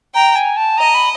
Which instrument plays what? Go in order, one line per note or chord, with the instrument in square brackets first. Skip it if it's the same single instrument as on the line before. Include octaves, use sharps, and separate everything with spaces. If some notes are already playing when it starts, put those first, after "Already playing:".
[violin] G5 [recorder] A#5
[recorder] G#5
A5
[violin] D#5 [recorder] A#5
[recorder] B5